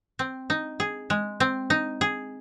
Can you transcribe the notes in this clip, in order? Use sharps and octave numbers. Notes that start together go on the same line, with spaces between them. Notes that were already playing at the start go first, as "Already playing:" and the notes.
C4
D#4
G#4
G#3
C4
D#4
G#4